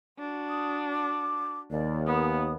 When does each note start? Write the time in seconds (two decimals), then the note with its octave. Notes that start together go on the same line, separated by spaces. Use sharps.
0.19 D4 F#4
0.49 D#6
0.92 D6
1.71 D#2 D5
2.06 B3 D#6